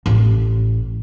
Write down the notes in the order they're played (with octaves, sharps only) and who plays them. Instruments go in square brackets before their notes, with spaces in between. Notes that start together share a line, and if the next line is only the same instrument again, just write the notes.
[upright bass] A1